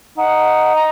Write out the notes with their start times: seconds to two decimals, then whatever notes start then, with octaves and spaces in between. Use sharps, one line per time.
0.17 D#4 F#5
0.75 A#5